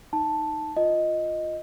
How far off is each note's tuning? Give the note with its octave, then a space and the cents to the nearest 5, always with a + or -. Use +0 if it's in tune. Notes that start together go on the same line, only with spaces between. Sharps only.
D#4 +0 A5 +0
F4 +0 D#5 +0